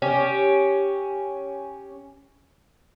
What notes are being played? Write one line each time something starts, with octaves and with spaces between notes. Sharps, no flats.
C#4 G4